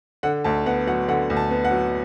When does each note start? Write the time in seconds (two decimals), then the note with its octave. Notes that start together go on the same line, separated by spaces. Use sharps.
0.23 D3 F#5
0.44 D2 A5
0.66 B3 F#5
0.87 F#3 F#5
1.08 D3 F#5
1.30 D2
1.37 A5
1.51 B3
1.65 F#5
1.71 F#3